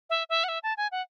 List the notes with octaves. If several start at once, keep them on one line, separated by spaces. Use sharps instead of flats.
E5
E5
F#5
E5
A5
G#5
F#5